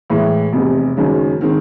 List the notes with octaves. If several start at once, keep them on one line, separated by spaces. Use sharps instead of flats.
A2 E3 G#3
F1 E2 C3
F#1 F#2 D#3 G#3 C#4
D#3 G#3 C4